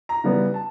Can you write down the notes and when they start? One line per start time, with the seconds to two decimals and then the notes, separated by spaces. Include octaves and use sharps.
0.09 A#5
0.24 C#3 E3 G3 B3
0.54 A5